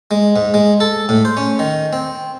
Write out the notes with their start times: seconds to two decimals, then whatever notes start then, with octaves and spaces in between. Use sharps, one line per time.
0.11 G#3
0.36 G#2
0.54 G#3
0.80 A4
1.09 A2
1.25 C5
1.37 C#4
1.59 D#3
1.93 C4